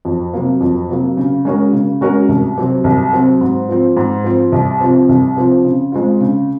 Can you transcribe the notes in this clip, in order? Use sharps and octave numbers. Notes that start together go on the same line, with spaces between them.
F2
C3 F#3 A#3
F2
C3 F#3 A#3
C#3
G#3 C#4 F#4 A#4
C#3
G#3 C#4 F#4 A#4
C2
C3 F#3 C4
C2
C3 F#3 C4
G#2
F3 C4
G#2
F3 C4
C2
C3 F3 C4
C2
C3 F3 C4
C#3
G#3 C4 F4
C#3